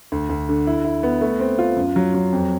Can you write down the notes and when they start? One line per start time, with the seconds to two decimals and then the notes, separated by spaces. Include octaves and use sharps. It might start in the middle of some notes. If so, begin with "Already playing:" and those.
0.12 D2
0.29 D2
0.49 D3
0.67 E4
0.85 E4
1.03 B3
1.21 A3
1.40 C4
1.59 F4
1.77 F#2
1.96 F#3
2.14 F#3
2.32 F2